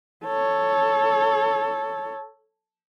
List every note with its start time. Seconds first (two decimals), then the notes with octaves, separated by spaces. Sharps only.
0.25 A4 C#5